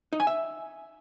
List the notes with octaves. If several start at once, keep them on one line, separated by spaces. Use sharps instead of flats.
D#4
G#5
E5